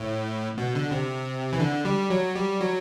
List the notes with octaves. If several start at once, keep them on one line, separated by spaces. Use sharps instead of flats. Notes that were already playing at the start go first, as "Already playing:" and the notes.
Already playing: A2
B2
D3
C3
E3
D3
G3
F#3
G3
F#3